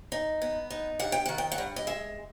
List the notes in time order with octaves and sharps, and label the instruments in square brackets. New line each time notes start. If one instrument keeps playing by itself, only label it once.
[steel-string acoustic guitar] D#4
B3
D#4
G2 F#5
G5
D#3 F#5
G5
F#5
G2
D#5
G#3 E5